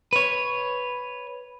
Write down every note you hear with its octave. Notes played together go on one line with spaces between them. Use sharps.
B4 C#5